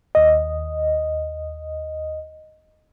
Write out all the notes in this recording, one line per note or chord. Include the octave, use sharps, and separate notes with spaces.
D#2 D#5